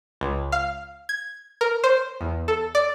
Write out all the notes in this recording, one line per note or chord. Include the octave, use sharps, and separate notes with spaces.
C#2
F5
G#6
A#4
C5
E2
A4
D5